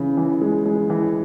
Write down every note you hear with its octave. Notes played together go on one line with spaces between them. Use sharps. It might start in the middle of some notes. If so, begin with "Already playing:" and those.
Already playing: C#3 E3
E3
G#3
G#3
E3